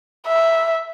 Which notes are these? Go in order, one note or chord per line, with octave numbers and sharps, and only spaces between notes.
E5